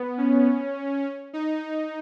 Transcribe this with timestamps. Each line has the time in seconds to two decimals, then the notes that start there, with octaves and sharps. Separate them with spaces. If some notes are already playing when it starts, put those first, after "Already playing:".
Already playing: B3
0.18 C#4
1.33 D#4